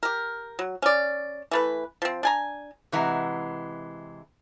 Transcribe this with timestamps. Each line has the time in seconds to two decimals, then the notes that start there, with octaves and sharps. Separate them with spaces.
0.03 G4 A#4
0.59 F#3
0.82 C#4 D5
1.51 E3 A3 B4
2.02 F3 C4
2.23 D4 G#5 A#5
2.92 C3 E3 G#3 F#5 A#5